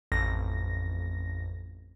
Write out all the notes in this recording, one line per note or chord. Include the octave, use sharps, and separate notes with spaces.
A1 F2 A#6